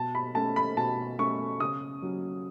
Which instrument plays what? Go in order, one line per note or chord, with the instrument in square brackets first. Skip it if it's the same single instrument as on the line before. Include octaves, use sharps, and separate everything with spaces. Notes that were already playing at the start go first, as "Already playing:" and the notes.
Already playing: [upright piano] B2 A5
B5
A3 C#4 A5
B5
B2 A5
A3 C#4 C#6
C#3 D#6
F#3 C#4